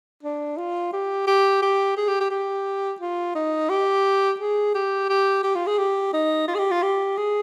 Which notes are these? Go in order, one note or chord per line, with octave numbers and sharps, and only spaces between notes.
D4
F4
G4
G4
G4
G#4
G4
G4
G4
F4
D#4
G4
G#4
G4
G4
G4
F4
G#4
G4
D#4
F4
G#4
G4
F4
G4
G#4